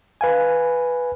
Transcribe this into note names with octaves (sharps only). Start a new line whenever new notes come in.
B4 F5 G#5